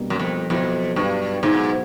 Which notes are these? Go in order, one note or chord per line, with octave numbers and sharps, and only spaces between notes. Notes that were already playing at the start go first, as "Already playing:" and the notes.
Already playing: B2 G3 A#3 D4
F#2
F2
F2 B2 F#3 B3 E4 A4
G2
G#2 B2 F#3 B3 E4 A4